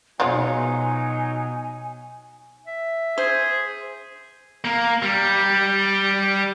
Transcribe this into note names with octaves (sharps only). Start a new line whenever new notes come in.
B2 F3 F#3 G#3 D#4 F4 C#5 G#5
E5
G#4 C5
A#3
G3